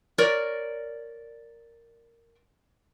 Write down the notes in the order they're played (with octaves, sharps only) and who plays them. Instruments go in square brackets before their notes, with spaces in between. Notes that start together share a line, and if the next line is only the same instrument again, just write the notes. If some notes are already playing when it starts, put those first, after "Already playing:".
[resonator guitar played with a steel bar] A#4 C#5 D5